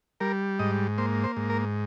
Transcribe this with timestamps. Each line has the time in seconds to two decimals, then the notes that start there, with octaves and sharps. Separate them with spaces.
0.20 G3 A#4
0.59 G#2 D#5
0.98 A#3 C5
1.24 C5
1.37 G#2
1.50 A#4